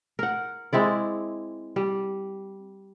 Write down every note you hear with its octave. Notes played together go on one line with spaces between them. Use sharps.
A#4 F#5
G#3 C4 E4 D5
G3